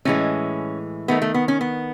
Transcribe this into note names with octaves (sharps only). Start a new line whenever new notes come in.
A2 E3 G#3 C#4
D#3 A3 B3
A3
B3
C#4
B3